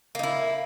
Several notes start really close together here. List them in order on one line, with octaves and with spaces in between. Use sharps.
A#3 D#4 E4